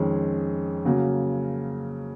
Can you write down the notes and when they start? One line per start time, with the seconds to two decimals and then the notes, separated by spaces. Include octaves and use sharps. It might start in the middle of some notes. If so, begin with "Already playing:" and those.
Already playing: F2 D#3 G#3 C#4
0.85 C#3 F#3 A#3